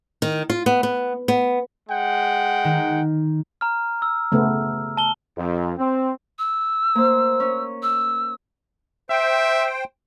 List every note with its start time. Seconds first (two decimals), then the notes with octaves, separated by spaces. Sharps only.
0.22 D#3
0.50 F4
0.66 B3
0.83 B3
1.28 B3
1.89 G#3 F#5 G5
2.64 D#3
3.61 A#5 F6
4.02 E6
4.32 C#3 A3 B3
4.97 A5 G7
5.38 F2
5.78 C4
6.39 E6
6.95 A#3 C5
7.40 C#4
7.83 E6
9.10 C5 E5 G5